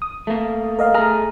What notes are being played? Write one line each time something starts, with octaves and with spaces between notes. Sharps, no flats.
D#6
A3 A#3
A#4 D#5 F5
A3 G#4 A#5 D#6 F6